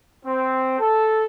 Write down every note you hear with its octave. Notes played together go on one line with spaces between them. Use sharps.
C4
A4